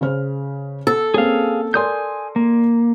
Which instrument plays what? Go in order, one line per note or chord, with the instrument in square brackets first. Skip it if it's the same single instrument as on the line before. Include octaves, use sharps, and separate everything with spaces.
[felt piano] C#3 C5 F6
[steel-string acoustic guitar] A4
[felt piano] A#3 C4 C#4 [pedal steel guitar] G#4 F5
[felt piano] A#4 D5 C6 [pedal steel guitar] G#5 D#6 G6
[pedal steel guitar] A#3